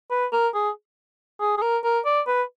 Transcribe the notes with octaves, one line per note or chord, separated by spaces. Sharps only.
B4
A#4
G#4
G#4
G#4
A#4
A#4
D5
B4